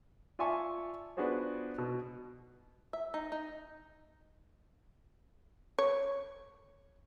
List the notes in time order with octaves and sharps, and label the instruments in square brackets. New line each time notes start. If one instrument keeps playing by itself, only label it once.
[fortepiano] F4 D5 E5 G#5 A5 C#6
B3 D4 F4 F#4 G#4 C5
B2
[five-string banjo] E5
D#4
D#4
[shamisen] C#5